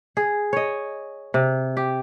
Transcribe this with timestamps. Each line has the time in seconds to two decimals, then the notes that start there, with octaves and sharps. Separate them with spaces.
0.17 G#4
0.53 C#5 D#5
1.34 C3
1.77 G4